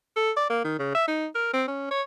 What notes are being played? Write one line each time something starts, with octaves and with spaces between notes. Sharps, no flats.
A4
D5
A#3
D#3
C#3
E5
D#4
A#4
C4
C#4
C#5